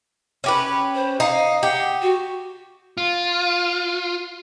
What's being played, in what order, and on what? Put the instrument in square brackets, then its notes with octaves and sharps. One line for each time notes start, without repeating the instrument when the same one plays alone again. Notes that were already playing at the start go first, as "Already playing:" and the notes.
[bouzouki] C#4 G4 B4
[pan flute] C5
[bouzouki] D#4 [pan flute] F5
[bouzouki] G4 [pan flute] F#5
[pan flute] F#4
[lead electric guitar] F4